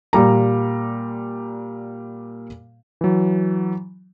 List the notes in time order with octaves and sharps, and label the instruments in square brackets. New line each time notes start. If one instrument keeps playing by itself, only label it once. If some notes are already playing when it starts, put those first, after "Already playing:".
[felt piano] A#2 G3 A#5
[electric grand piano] E3 F#3